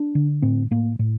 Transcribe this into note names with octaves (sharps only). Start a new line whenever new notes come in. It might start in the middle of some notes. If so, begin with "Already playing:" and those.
Already playing: D4
D3
A2 C4
A2 A#3
A2